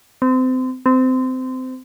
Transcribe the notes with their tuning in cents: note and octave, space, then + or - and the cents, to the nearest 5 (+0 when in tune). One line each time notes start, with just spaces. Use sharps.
C4 -30
C4 -25